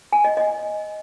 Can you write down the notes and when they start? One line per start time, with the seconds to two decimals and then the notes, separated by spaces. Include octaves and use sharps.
0.13 G#5
0.25 D#5
0.37 D#5